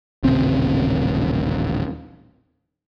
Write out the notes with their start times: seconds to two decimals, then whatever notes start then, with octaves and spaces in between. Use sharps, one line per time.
0.23 D#1 A1 C#3 C4